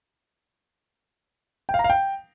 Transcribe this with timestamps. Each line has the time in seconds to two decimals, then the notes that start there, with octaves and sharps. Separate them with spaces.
1.69 G5
1.74 F5
1.79 A#5
1.84 F5
1.90 G5